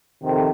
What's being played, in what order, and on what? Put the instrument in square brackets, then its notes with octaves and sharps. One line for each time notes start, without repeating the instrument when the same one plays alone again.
[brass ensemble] F2 C3 D#3